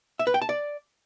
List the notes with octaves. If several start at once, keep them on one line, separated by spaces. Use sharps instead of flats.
E5
B4
G5
A5
D5